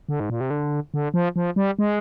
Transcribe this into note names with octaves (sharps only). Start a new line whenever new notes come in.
D3
G#2
A#2
C3
D3
D3
F3
F3
G3
G#3